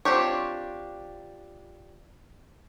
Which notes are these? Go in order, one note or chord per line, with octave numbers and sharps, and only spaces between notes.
C4 D4 F4 G4 C#5